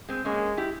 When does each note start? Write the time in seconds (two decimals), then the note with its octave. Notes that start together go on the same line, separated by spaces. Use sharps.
0.09 G#3 C4
0.25 G#3 A#3 C#4
0.57 E4 G4